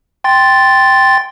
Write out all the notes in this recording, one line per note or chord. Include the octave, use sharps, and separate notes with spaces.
G5 C6 A6